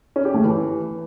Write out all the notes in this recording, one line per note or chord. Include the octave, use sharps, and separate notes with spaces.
C#4
G4
A3
E3